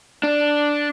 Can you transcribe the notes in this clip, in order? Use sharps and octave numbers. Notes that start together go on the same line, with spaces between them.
D4